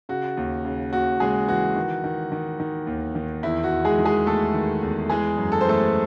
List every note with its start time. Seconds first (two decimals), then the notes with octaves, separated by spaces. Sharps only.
0.09 C#3 F#4
0.37 D#2
0.65 C#3
0.93 D#2 F#4
1.20 C#3 G#3 G#4
1.48 E3 F#4
1.76 D#3
2.04 D#3
2.32 D#3
2.60 D#3
2.87 D#2
3.15 D#3
3.43 E2 E4
3.63 F#4
3.71 E2
3.85 G#3 G#4
3.98 D#3
4.05 G#3 G#4
4.26 E2 A3 A4
4.54 D#3
4.82 E2
5.10 E3 G#3 G#4
5.38 F#2
5.52 A4
5.61 C5
5.65 E3 A3 A4